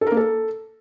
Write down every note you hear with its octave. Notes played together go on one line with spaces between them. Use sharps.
A4
A#4
A#3
A4